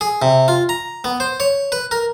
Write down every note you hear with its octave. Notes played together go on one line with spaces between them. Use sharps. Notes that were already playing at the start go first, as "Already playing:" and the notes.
G#4
C3
F4
A#5
B3
C5
C#5
B4
A#4